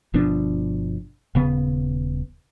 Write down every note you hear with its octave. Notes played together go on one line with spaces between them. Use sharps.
G1 B2 F3 D4
D#1 C#3 B3